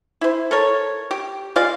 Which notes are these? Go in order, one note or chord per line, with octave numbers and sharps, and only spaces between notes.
E4 C5
A4 A#4 C#5
G4
G#3 F4 D5 F5